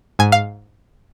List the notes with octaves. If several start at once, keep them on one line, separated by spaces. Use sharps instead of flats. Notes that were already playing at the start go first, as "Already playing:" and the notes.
G#2 G#5
F5